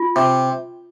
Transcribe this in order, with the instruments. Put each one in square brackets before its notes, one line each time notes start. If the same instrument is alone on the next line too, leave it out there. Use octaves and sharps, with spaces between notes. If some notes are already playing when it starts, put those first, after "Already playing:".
Already playing: [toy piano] F4
[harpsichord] C3